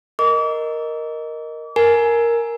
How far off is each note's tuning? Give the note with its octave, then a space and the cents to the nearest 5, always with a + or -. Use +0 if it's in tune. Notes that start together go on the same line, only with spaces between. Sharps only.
A#4 +0 D#5 +0 D6 -40
A#4 +0 G#5 +20